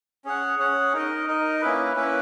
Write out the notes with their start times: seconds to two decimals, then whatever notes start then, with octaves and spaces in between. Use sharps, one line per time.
0.25 C#4 G#4 C#5 F#5
0.59 C#4 G#4 C#5 F#5
0.93 D#4 A#4 D#5
1.27 D#4 A#4 D#5
1.61 A#3 C#4 E4 B4
1.96 A#3 C#4 E4 B4